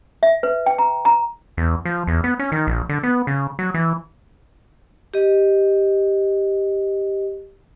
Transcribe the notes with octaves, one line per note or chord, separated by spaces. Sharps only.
E5
B4
G5
A#5
A#5
E2
F3
E2
B3
C#4
D#3
A#1
D3
B3
C#3
F#3
E3
G4 D#5